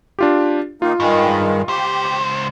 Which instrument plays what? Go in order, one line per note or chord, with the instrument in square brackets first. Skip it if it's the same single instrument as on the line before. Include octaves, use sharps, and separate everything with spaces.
[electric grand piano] D4 F4 G4
[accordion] D#3 A#3 D#4 [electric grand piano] F4
[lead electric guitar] G2 [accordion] D#3 G#3
[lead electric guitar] C#2 C5 [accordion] G4